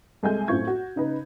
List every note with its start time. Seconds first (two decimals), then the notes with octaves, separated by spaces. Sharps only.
0.23 C2 G#3 A4 G#5 G6
0.48 F#2 A2 C4 F4 C#6 G#6
0.67 F#4
0.96 C#3 D#4 B4